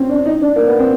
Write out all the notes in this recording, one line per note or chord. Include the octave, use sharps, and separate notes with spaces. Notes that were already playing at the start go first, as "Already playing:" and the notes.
Already playing: C4 C#4
D4
D#4
D4
A#3
B3
C4